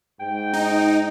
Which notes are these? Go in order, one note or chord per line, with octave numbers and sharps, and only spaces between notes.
G#2 G5
D#4